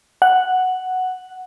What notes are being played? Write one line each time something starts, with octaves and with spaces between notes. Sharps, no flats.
F#5